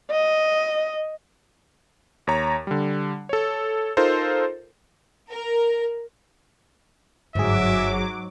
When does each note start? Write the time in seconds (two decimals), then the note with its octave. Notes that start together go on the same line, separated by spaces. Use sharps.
0.11 D#5
2.27 D#2 C#5 A#5
2.67 D3 G3
3.29 A4 C#5
3.97 D#4 F4 A4 A#4 C5
5.32 A#4
7.35 G1 G#2 F#3 G#4 E5 D6